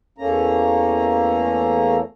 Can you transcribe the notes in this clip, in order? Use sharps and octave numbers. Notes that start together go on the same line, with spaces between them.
E2 A3 A#3 C#4 A#5